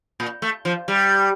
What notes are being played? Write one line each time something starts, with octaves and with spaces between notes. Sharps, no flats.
A#2
A3
F3
G3